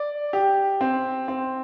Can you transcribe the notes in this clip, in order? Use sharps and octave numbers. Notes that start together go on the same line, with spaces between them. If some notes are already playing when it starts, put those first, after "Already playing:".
Already playing: D5
G4
C4
C4